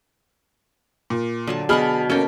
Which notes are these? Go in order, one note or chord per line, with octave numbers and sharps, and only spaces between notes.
A#2
D3 F#3 A5
B2 G#4 F#5 A5 B5 F6
A#3 C#4 A4 G5